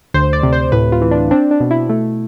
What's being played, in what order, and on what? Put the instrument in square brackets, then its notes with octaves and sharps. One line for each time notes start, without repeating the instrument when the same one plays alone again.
[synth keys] D2 C5
D5
C3
C5
A2 B4
F4
E3
D4
C4 D4
D4
B2
E4
A3